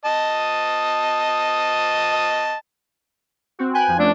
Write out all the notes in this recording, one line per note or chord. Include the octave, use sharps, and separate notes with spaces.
D#5 A5 D#6
C4 F#4
B4 G5 G#5 F#6
F2 F3
A3 C#4 D4